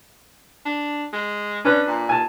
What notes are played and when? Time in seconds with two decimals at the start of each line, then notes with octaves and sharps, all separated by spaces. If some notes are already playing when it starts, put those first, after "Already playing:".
0.65 D4
1.13 G#3
1.65 C#4 D4 B4
1.87 A#2
2.09 G#5 A5